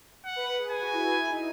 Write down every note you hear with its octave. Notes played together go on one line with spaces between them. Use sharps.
F#5
B4
G#4
G#4 G#5
F#4
E4
G#4
F#4
E4
D#4